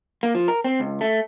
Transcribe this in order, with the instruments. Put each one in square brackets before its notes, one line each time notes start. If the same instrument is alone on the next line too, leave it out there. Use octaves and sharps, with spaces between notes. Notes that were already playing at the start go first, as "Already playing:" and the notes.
[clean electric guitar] A#3
F3
A#4
C4
C#2
A3